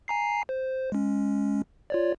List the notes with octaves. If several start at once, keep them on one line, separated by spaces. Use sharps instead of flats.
G#5 A#5 C7
C5
G#3 C#4
F4 C#5 D5